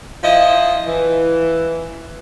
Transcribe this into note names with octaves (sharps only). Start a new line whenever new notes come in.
F3 E4 F4 D#5
E3